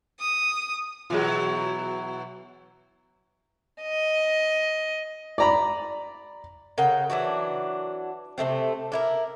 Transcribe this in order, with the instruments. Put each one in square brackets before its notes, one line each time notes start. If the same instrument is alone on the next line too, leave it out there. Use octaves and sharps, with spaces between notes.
[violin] D#6
[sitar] B2 E3 F#3 [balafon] F4 G#4
[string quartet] D#5
[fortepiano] D5 A#5 B5
[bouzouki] C#3 A#4 F#5 G5
E3 F#3 D4 F#4
C3 G#3 A3 C4
D4 E4 A#4